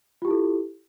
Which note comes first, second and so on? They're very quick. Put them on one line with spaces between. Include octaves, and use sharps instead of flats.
F4 G4 E4 A4